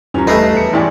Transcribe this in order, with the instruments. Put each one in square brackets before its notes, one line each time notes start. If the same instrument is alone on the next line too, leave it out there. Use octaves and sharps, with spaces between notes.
[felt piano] D#1 A#5 [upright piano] E3 F3 C#4
[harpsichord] A3 D#4 [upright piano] B4 C7
[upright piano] E1 C#7 [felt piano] B4
[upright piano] A1 G#2 G3 [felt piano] E4 D5 G#5